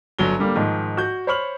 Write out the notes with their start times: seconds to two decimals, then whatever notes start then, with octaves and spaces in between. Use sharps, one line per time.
0.19 G1 F#3 G7
0.39 D3 G3 A#3
0.55 G#2 D#3 F3
0.97 F#4 G6
1.27 C5 C#5 B5 C#6 F6 F#7